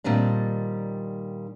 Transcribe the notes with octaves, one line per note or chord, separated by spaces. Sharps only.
A#2 D#3 G3 C4 D4